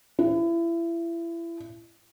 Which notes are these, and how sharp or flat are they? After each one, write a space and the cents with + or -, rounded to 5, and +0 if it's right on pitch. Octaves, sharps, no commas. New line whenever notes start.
E4 +30